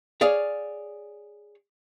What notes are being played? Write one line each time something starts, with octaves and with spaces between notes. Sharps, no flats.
G#4 C#5 D5 F5